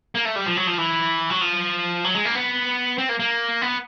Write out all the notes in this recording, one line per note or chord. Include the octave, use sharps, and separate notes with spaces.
A#3
A3
G3
F3
F#3
F3
E3
F#3
F3
F#3
G#3
A#3
B3
C4
A#3
A#3
B3